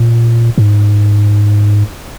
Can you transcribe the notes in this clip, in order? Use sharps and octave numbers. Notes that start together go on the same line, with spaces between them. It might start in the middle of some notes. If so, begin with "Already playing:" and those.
Already playing: A#2
G#2